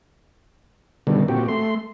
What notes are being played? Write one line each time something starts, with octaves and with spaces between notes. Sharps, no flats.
B2 D3 D#3 G3
A#2 C4 F#4 G4
A3 C6